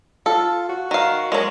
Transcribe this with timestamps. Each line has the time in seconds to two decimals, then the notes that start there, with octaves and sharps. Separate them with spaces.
0.26 F4 A4
0.69 F#4
0.91 D#3 F5
1.32 F#3 G#3 A#3